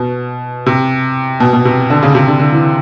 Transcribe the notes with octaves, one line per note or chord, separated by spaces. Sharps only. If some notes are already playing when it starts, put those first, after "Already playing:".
Already playing: B2
C3
B2
B2
C3
D3
C#3
C3
D3
D3
E3